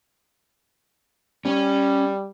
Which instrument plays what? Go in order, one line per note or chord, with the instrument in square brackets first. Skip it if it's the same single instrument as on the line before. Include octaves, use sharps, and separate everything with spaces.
[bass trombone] G3 [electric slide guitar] C#4 C#5